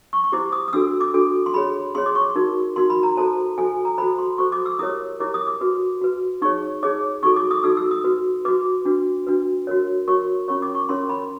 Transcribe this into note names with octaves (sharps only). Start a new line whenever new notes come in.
C#6
C#6
E4 G4 C5 D6
D#6
D#6
D4 F#4 A4 E6
D6
D4 F#4 A4
C6
F4 G#4 C#5 B5
F4 G#4 C#5 C6
D6
C#6
D#4 F#4 A#4
D#4 F#4 A#4 C6
B5
A#5
F#4 A4 C5 A5
F#4 A4 C5 G#5
A#5
F#4 A4 C5 B5
C6
F#4 A4 C5 C#6
D6
E6
E4 G4 A#4 C#5 D#6
E4 G4 A#4 C#5 D6
D#6
D6
F#4 B4
F#4 B4
D#4 G#4 C#5 C#6
D#4 G#4 C#5 D6
D#4 F#4 A4 C#6
D6
D#6
D#4 F#4 A4 E6
E6
D#6
F#4 B4
F#4 B4 D6
D4 F#4 B4
D4 F#4 B4
F#4 A#4 C#5
F#4 A#4 C#5 C#6
C#4 F4 A#4 C#5 C#6
D6
C#6
C#4 F4 A#4 C#5 C6
B5